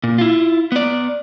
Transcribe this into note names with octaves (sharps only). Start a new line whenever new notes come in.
A#2
E4 F4
B3 D5